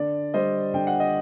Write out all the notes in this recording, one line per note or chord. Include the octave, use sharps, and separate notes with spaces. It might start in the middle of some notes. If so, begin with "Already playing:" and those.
Already playing: D3 D5
G3 C5 D#5
D3 G5
F#5
D#5